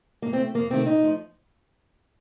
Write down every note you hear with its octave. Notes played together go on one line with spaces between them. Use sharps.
A2 A#3
C4
A3
F2 A#3
C3 D#3 A3 C4
A#2 D#4
F3 A3